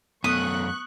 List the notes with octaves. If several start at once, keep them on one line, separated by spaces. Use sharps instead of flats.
F#2 A3 B3 C#6 D#6 F#6